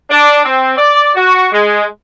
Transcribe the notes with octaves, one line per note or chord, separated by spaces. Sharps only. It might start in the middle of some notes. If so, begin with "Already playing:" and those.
D4
C4
D5
F#4
G#3